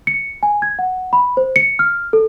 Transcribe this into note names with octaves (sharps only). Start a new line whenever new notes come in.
C#7
G#5
G#6
F#5
B5
C5
C#7
F6
A4